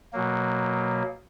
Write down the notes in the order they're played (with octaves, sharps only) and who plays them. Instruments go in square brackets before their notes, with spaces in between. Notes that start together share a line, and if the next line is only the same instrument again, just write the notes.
[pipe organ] B2 F#3 A#3